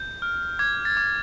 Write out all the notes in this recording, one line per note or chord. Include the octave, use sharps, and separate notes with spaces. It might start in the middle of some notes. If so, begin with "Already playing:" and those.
Already playing: G6
F6
D6 G#6
A6
D6